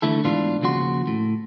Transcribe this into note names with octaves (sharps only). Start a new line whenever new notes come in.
D3 E3 A3 E4 A4
G#2 B2 E3 D4 F4
D#2 C#3 F3 F#4 C6
A2